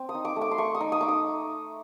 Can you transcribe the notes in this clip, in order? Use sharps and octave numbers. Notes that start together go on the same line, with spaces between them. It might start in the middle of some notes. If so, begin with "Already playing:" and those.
Already playing: C4
D#6
D#4
D6
A3
D6
C6
A3 C#6
D#6
D#4
D#6
D#4 D6
D#6